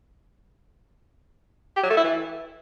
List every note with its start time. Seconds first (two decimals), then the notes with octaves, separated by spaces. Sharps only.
1.77 G4
1.83 F#3
1.90 A3
1.97 E4
2.04 E3